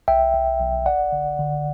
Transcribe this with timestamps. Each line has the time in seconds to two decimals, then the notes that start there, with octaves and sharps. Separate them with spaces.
0.08 B1 E5 G5
0.34 B1
0.60 B1
0.86 G1 D5 F#5
1.12 D3
1.39 D3